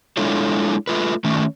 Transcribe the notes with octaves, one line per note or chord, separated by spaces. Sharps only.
G#3 D4 E4 F4 A4 C#5
A3 F4 B4
D#3 A3 C#4